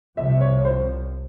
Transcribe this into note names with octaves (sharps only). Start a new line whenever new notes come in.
C2 C3 F3 E5
C#5
C5